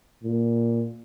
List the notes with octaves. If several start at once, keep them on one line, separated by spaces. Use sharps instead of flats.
A#2